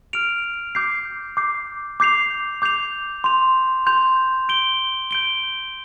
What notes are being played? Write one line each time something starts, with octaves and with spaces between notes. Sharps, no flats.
F6 D7 F7
D6 G6 C7
D6 G6 C7
D6 G6 C7 F7
D6 G6 C7 F7
C6 G6 F7
C6 G6 F7
G6 D7 G7
G6 D7 G7